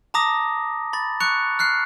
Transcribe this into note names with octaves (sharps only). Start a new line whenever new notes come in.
A5 A#5 D6 D#6 A#6
B5 A6
C#6 F#6 C#7 F7
F6 F#6 C7